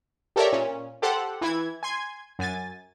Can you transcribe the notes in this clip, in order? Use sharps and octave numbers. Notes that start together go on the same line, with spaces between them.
G4 A4 A#4 C#5 D5 E5
A#2 C#4
G4 A4 C5 F#5
E3 E4 G#6
G#5 C6 G#6
F#2 G#5 A6